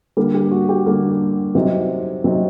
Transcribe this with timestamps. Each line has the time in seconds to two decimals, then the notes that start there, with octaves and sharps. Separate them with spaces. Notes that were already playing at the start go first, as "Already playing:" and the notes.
0.17 D3 G3 A#3 A4
0.34 G4
0.51 F#4
0.69 G4
0.86 D3 G3 A#3 A4
1.55 C3 F#3 C4 D#4
2.24 C3 F#3 C4 D#4